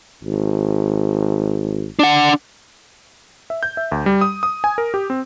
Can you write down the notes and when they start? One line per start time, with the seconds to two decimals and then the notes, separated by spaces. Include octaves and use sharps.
0.23 G#1
1.99 D4 F#5
3.50 E5
3.63 G6
3.77 E5
3.92 D2
4.06 G3
4.21 D#6
4.43 D#6
4.64 G#5
4.78 A#4
4.94 G4
5.10 C4